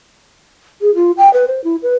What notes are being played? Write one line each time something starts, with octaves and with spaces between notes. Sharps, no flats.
G#4
F4
G5
B4
C5
E4
B4